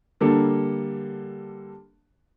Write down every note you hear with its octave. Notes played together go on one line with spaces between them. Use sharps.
D3 G3 A#3 A4